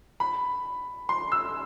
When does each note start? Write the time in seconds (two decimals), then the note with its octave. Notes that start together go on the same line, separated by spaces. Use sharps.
0.20 B5
1.09 C6
1.32 E6